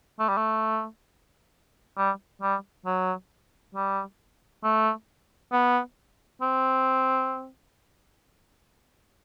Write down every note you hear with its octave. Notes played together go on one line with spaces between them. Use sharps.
A3
G3
A3
G3
G3
F#3
G3
A3
B3
C4